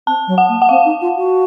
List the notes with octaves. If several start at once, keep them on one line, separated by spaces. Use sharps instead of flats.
C4 A5
F#3
F#5
A#3
F#5
C4 F5
D#4
F4
F#4